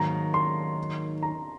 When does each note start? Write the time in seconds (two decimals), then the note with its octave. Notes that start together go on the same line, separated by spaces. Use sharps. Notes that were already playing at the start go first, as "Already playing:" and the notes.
Already playing: G#2 D#3 F#3 A#3 A#5
0.34 C6
1.23 A#5